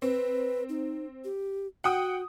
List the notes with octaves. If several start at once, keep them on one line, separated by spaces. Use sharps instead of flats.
C4 B4
D#4
G4
F#4 F#5 G5 D#6